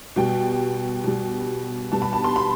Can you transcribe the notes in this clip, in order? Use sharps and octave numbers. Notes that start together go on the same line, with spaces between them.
B2 G3 G5
B2 G3
B2 G3 A5
B5
A5
C6
B5